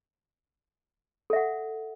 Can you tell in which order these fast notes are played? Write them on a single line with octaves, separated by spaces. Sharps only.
A4 E5 F#5